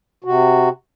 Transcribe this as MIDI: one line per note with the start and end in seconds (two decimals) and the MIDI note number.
0.24 0.69 48
0.24 0.69 66